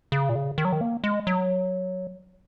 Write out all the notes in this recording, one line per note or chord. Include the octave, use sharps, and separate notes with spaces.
C#3
A#2
C#3
D#3
F#3
D#3
A#3
G#3
F#3